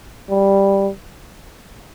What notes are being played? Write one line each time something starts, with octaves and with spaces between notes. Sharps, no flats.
G3